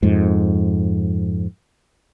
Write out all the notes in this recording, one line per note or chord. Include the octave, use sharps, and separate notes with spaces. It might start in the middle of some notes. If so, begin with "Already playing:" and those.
F2 G#2